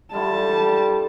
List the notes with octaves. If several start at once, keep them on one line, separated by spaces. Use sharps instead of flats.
D3 G3 E4 F4 A5